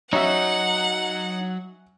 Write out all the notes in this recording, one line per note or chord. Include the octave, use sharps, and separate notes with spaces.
F#3 C#4 D#4 F#4 E5 F#5